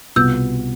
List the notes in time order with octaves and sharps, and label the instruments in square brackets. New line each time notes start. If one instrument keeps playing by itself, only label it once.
[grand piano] C2 B2 B3 F4 [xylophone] E6 G6